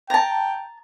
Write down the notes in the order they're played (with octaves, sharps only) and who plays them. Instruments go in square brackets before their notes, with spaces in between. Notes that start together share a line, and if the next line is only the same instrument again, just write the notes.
[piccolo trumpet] G5 [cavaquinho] A5 A#5